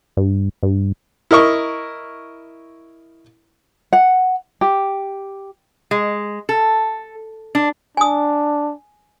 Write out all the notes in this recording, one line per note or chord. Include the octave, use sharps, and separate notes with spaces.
G2
G2
E4 A#4 D#5 C#6
F#5
G4
G#3
A4
D4
D4 G#5 D#6